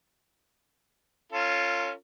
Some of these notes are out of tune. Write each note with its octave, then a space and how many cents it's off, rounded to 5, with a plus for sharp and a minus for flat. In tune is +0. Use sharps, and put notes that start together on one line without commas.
C#4 +0 F4 +0 A4 +45